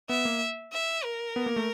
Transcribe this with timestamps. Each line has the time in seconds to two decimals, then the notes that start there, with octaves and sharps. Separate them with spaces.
0.09 B3 E5
0.25 A#3
0.73 E5
1.04 A#4
1.36 B3
1.46 A#3
1.56 A3